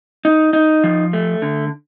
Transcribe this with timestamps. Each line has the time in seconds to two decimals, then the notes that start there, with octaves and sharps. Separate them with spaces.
0.25 D#4
0.53 D#4
0.84 F3
1.13 A3
1.42 D3